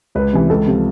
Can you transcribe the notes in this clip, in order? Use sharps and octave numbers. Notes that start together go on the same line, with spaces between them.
C#2 B4
C3 E3
C#2 A4
C3 F3